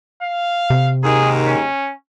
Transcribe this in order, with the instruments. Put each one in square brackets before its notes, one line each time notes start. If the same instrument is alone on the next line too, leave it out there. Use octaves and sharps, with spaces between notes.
[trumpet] F5
[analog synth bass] C3
[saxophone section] D#2 G#2 D#3 [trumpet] G#4
[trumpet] C#4